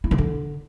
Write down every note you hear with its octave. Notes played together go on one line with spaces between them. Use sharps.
E4
D#3
D3